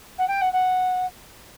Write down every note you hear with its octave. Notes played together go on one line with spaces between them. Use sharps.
F#5
G5
F#5
F#5